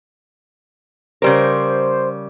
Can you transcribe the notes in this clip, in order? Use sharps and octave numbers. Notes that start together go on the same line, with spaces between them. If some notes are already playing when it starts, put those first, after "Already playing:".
C#3 G3 A#4 C5